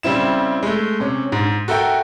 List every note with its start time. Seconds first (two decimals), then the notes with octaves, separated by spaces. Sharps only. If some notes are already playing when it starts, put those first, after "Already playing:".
0.03 C#3 G3 C4 E4 E7
0.63 G#3 A3
1.00 C3 C#4
1.32 G#2
1.68 F#4 A4 A#4 E5 G5